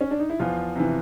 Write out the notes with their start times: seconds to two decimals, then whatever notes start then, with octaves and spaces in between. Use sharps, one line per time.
0.01 C#4
0.11 D4
0.19 D#4
0.30 E4
0.39 E2 F3 F4
0.75 C3 E3